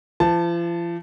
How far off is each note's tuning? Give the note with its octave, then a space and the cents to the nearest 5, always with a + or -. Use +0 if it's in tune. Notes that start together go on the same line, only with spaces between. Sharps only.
F3 -40 A5 +0